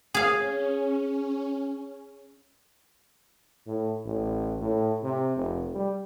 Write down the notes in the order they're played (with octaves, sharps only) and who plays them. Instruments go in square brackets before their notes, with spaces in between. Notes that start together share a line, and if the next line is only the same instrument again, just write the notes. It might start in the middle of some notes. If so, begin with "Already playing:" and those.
[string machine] C#4 [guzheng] G#4 F5
[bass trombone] A2
A1
A2
C3
F1
G3